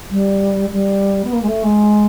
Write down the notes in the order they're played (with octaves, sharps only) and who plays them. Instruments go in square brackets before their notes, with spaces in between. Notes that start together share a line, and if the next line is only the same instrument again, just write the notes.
[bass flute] G3
G3
B3
A#3
G#3
A3
G#3